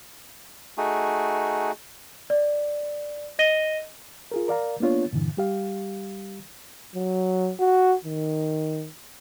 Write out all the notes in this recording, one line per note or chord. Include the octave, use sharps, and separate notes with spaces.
A3 D#4 F#4 G#4
D5
D#5 A#6 D#7 G7
F4 G#4 A#4
A#4 D5 F5 A#5
A#3 B3 D4 F4 C#5
G2 A#2 D3 E3
G3 G4 F5
F#3
F#4
D#3